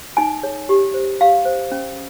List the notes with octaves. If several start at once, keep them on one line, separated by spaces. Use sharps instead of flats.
D#4 G#5
G#4 C#5
G4
C5
G4 F5
C5
C#4